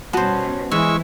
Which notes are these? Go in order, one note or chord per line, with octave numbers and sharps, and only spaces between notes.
B2 G3 B3 C#4 F#4 C5 A5
E3 G#3 E4 C#6 E6